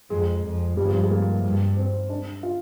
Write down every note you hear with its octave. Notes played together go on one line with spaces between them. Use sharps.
F2 G#3
F2
G2 G3
F3
G3
G#3
A#3
G2
C4
D4
F4